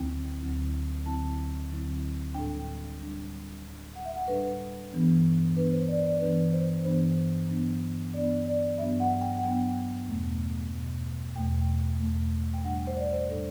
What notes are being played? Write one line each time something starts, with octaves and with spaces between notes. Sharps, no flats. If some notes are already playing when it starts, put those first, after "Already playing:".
Already playing: D2 D3 F#3 C4 E4 G5
D2 D3 F#3 C4 E4
D2 D3 F#3 C4 E4 A5
D2 D3 F#3 C4 E4
A2 G3 D4 G5
A2 G3 D4
A2 G3 D4
F#5
E5
F#5
A2 G3 D4 B4
G2 E3 B3 D4
G2 E3 B3 D4 B4
C5
D5
D5
G2 E3 B3 D4 B4
C5
G2 E3 B3 D4 C5
G2 F#3 B3 D4
G2 F#3 B3 D4 D5
D5
G2 F#3 B3 D4 E5
F#5
G5
F#5
G2 F#3 B3 D4 G5
E2 B2 A3
E2 B2 A3
E2 B2 A3 G5
E2 B2 A3
G5
A2 G3 D4 F#5
C5
D5
C5
A2 G3 D4